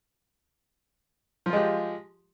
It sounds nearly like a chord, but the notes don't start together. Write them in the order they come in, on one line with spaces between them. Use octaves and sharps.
F3 F4 G#3 G4